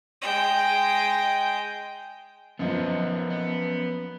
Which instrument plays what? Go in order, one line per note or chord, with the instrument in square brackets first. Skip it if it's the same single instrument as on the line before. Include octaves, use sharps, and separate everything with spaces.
[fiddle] G#3 G5
[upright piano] F#2 F3 [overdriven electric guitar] B3 D#4
[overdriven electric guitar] B3